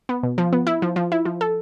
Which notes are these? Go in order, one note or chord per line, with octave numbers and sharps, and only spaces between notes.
B3
B2
F3
B3
E4
F3
F3
E4
F3
A4